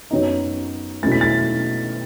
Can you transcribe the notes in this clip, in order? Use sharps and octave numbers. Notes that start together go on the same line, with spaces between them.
F#2 F#3 B3 D#4
B2 F#3 A3 E4 A6
B6
A6